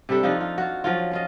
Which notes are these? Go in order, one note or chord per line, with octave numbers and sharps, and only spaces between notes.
C3 G3 D4 A4
F3 D4 D#4 F4
F4
F4 F#4
F3 F#3 F4
C#4 F4 D#5